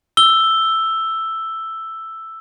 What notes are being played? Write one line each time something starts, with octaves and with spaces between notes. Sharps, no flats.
E6 G7